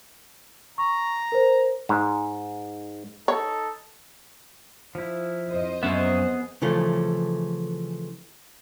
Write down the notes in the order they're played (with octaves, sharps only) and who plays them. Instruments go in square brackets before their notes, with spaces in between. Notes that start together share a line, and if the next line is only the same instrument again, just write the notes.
[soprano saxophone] A#5 [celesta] C#6
[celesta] A#4 C5
[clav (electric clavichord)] G#2
[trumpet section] D#4 A4 [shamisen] C#5
[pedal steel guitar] F3 E4
[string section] F2 C5 D#5
[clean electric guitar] F#2 C#4 E5 [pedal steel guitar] B3 G#4
[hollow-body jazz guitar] C#3 E3 F3 A3